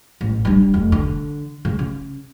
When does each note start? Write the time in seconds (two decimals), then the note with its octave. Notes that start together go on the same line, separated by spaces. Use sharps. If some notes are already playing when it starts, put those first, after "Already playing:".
0.21 A1
0.45 G3 D4
0.74 F1
0.92 D3
1.65 C#3
1.79 C#4